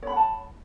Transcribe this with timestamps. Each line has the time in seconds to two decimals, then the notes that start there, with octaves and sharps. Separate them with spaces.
0.03 C#5
0.07 B5
0.12 F#5
0.16 A5